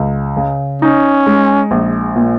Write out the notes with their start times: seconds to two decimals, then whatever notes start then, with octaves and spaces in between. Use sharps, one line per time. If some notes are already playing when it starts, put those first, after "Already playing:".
Already playing: C#2
0.37 C#3
0.82 C#4 D#4
1.26 G#3
1.71 A#1
2.16 A#2